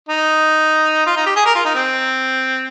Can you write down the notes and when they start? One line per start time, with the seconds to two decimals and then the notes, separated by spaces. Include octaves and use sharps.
0.09 D#4
1.06 F4
1.16 D#4
1.26 G4
1.36 G#4
1.46 A#4
1.55 F4
1.65 D#4
1.75 C4